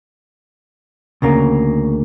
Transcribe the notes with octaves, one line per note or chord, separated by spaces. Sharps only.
D2 C#3 A#3